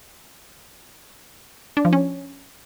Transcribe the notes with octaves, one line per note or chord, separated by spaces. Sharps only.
D4
F3
C#4